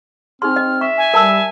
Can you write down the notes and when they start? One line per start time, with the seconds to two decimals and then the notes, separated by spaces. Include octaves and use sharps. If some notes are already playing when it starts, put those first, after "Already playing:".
0.42 C4 D#4 G#4 C6 F6
0.56 D#5
0.81 E5 C#6
0.98 G#5
1.14 G3 A#4 A5 E6